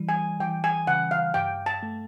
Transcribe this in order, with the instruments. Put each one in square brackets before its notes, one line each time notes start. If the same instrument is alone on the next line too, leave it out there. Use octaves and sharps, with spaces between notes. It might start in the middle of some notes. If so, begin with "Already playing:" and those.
Already playing: [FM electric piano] E3 G3
[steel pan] G#5
[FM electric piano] E3 [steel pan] G5
[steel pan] G#5
[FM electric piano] C#3 [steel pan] F#5
[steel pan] F5
[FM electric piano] G2 [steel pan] G5
[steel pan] A5
[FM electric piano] A3